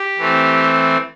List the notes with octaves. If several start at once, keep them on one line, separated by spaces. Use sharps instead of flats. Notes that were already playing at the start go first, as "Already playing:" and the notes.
Already playing: G4
E3 A3 C4